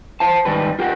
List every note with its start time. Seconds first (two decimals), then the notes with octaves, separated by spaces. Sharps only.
0.20 C5 F5 A5
0.45 G#2 D#3 G3 B4
0.79 F4 G4 A#4 F#5